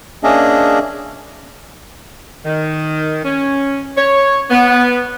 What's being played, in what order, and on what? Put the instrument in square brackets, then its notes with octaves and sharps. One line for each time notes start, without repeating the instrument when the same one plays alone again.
[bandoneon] A#3 C#4 D4 G#4 D#5 E5
[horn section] D#3
C#4
C#5
B3